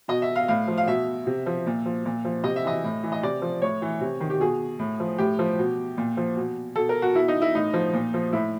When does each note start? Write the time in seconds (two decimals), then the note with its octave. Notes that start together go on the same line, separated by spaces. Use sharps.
0.08 B2 D#5
0.22 E5
0.36 F5
0.48 A2 F5
0.68 F3
0.78 F5
0.87 B2 E5
1.27 C3
1.46 F3
1.66 A#2
1.86 F3
2.05 A#2
2.25 F3
2.44 C3 D#5
2.56 E5
2.64 E3 D#5
2.84 A2
3.03 E3
3.12 D#5
3.23 C3 D5
3.42 F3
3.62 A2 C#5
3.82 E3
4.01 C3
4.21 D#3
4.30 G4
4.40 B2 G#4
4.79 A2
5.00 F3
5.18 A2 G4
5.39 F3
5.59 B2
5.98 A#2
6.17 F3
6.37 B2
6.76 B2 A4
6.89 A#4
7.02 F#4
7.15 B2 E4
7.28 D#4
7.42 E4
7.55 A2 D#4
7.74 F3
7.93 A#2
8.14 F3
8.33 A2 E4